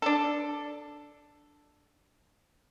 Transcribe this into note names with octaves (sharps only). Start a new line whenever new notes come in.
D4 A4